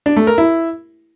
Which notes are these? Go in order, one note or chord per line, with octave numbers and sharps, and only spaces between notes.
D4
A3
A#4
E4